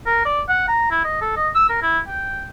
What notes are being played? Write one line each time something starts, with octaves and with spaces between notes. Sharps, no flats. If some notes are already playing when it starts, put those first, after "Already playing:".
A#4
D5
F#5
A#5
E4
D#5
A4
D#5
E6
A#4
E4
G5